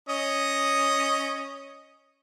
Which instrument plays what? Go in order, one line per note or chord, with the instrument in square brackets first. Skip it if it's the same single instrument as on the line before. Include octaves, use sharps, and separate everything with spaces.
[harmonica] C#4 D#5 D#6